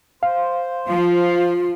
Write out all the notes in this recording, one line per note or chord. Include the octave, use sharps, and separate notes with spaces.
C5 F5
F3 F4